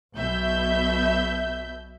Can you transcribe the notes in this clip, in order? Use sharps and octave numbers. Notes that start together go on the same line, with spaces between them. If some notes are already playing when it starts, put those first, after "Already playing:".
B1 B2 E5 G6